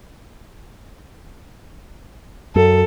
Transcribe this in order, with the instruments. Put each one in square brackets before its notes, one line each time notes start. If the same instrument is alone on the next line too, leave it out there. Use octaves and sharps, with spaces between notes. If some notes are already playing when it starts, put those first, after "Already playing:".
[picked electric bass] F#2 [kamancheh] A4